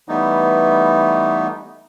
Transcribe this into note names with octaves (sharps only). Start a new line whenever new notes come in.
E3 G3 A3 B3 D#4